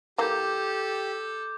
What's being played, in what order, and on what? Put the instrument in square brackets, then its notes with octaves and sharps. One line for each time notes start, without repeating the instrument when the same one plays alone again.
[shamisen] E3 A#3 [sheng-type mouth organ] G4 [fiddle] A4 [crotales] D6 G6